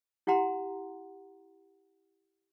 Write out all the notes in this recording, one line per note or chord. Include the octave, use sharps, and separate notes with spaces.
E4 G4 F#5 A#5 C6